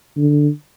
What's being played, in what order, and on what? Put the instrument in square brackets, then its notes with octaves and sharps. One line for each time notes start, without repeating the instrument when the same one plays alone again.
[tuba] D3